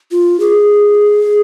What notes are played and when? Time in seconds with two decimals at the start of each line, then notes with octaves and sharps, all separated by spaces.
0.11 F4
0.40 G#4